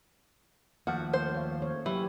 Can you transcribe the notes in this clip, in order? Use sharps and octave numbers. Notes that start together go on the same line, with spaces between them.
D#2 F3 A3 F#4
C5
C#5 F5
A#3 C#5
E3 F#3 G4